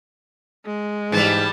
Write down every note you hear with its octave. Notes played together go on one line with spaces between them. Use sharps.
G#3
G#2 E3 G3 A5